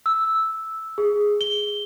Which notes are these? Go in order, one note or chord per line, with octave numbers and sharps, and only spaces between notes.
E6
G#4
G7